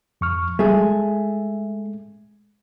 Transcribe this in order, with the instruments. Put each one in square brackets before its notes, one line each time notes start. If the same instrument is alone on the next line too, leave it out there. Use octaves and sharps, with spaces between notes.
[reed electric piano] F2 C#6 F6
[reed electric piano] G3 [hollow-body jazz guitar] A3 G#4
[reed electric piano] G#3